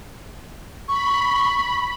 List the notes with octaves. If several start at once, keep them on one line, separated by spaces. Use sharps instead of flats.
B5 C#6